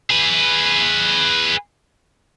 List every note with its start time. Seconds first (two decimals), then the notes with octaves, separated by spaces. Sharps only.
0.10 G#4 B4